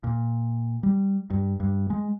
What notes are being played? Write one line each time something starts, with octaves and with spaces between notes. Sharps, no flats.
A#2
G3
G2
G2
G#3